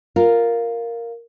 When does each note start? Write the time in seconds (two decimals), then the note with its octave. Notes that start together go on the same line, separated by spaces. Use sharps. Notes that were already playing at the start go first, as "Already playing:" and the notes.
0.16 F4 A#4